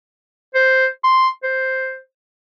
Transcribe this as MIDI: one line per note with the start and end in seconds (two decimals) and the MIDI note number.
0.55 0.87 72
1.04 1.28 84
1.43 2.00 72